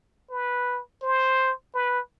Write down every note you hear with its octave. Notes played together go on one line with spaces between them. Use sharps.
B4
C5
B4